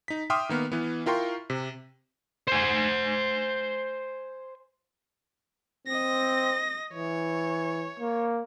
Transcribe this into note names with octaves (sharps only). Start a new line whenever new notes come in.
D#4 B6
E5 G5 C6 D6 D#6 F6
D#3 A#3 B3
E3 B3
E4 F4 A#4 G5 C6 C#6
C3
C5 G#5
C4 D#5 A#6
E3 C#5
A#3